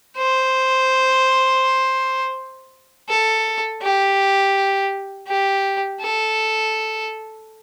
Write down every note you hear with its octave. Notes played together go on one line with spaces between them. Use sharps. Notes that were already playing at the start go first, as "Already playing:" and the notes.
C5
A4
G4
G4
A4